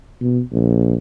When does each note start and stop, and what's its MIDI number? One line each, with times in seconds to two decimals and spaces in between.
0.21 0.40 47
0.53 0.95 34